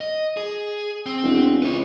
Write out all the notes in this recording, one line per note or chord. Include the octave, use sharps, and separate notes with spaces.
D#5
G#4
C4
E1
C#2 B4 C#5